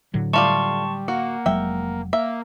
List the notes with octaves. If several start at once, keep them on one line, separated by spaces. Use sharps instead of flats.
A2 D3 F#3
G3 A3 F4 D5 A5 C6 C#6
A#3 F#4 F#5
F1 F#3 G#3 E5 G5
A#3 E5